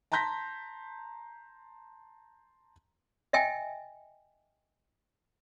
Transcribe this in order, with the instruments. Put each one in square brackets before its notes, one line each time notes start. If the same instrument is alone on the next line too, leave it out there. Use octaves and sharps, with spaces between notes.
[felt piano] A5 A#5 C6 G6 A#6 B6
[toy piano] D#5 E5 G5 G#5